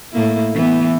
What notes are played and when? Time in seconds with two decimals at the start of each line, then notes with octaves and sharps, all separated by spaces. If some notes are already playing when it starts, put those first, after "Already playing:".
0.13 A2 A#3 E4
0.54 E3 B3